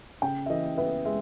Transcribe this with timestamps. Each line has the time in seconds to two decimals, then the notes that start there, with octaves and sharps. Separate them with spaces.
0.22 C#3 G5
0.46 E5
0.49 E3 D#5
0.78 B3 E5
1.05 G#3 E5